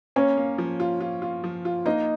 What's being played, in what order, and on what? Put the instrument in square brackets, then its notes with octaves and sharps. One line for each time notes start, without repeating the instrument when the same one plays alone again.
[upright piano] A#3 [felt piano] C#4 C#5
[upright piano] A#3
F3
F4
F4
F4
F3
F4
[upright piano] A#3 [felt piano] D#4 D#5